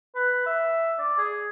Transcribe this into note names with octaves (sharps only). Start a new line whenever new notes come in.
B4
E5
D5
G#4